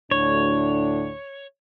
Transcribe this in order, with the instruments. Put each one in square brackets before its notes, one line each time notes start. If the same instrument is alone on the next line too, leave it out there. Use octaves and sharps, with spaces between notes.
[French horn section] D2 A2 D4 [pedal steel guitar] C#5